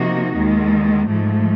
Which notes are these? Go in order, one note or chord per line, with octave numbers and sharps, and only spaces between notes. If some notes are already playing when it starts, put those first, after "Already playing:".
Already playing: C3 F3 A#3 D#4 F#4
D#2 D#3 G#3
G#2 F3 A3